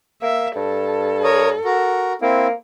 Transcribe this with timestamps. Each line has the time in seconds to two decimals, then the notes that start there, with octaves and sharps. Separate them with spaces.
0.22 A#3 E5
0.56 G2 A4
1.24 A#4 C#5 D#6
1.65 F#4 A#4
2.22 A#3 C4 E4